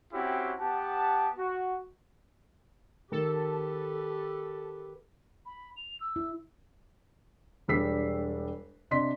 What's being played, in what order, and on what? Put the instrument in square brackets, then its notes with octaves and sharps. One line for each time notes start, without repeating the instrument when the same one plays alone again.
[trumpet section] C4 C#4 E4 F#4 G4
B3 G4 F#5 A5
F#4
[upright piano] D#3 [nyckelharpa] G4 B4 [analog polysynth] A4
[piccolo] B5
F7
E6
[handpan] E4
[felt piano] E1 G3 D4 E6 B6 C7
C3 D4 D#5 C6 B6